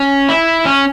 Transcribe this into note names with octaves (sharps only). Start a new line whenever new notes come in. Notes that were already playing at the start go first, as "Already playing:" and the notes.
Already playing: C#4
E4
C#4